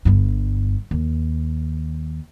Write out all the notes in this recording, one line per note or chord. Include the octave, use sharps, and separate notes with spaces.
G1 G2
D#2